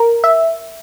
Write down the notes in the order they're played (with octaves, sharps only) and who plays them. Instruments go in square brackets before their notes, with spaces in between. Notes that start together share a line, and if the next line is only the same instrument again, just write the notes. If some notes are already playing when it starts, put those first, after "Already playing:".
Already playing: [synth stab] A#4
E5